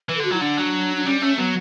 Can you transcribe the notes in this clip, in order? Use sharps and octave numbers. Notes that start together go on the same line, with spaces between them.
E3 B4
A4
D3
F#4
F#3 E4
D3 D4
F#3
D4
G3 C#4
A3 C#4
F#3 B3